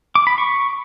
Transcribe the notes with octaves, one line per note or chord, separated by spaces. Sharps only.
D6
B5
C#6